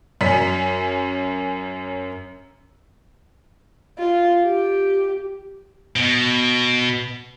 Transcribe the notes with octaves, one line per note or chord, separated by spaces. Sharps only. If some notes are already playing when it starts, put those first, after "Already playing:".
F#2 C#4 B6
F4
G4
B2